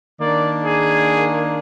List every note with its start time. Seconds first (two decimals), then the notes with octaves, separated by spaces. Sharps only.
0.20 D#3 A#3 D4 D5
0.65 G#4